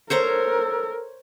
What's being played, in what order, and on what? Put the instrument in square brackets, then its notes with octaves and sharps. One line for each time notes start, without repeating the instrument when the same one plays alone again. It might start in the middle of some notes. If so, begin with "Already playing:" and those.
[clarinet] A4 [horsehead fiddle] A#4 [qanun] C5 C#5 A#5